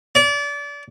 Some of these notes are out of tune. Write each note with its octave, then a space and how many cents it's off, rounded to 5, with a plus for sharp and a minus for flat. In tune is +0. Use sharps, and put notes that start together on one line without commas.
D5 -30